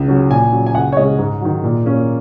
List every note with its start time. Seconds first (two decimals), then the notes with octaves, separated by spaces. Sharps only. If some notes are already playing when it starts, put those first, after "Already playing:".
Already playing: C#2
0.08 C#3 F#3 C#4
0.30 A#2 G#5
0.52 F#3 C#4
0.66 G#5
0.74 C#2 F#5
0.92 C#5
0.97 C#3 G#3 C#4 D#5
1.19 G#2
1.41 D#3 F#3
1.64 A#2
1.85 A#3 C#4